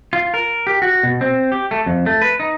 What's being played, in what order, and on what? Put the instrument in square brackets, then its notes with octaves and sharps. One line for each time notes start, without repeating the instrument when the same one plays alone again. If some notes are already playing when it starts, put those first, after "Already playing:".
[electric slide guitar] F4
A#4
G4
F#4
B2
C4
G4
A3
F2
A3
B4
D#4